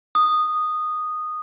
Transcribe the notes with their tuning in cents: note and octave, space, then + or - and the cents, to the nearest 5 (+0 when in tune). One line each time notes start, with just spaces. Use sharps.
D#6 -10